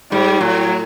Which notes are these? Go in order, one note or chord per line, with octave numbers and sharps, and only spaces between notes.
G#2 G3
A2 F#3